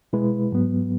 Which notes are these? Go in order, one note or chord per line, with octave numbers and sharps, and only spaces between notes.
B2 G#3 E4 B4
G#2 F#3 B3